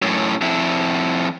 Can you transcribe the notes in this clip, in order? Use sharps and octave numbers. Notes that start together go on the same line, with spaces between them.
F#2 A2
F2 E4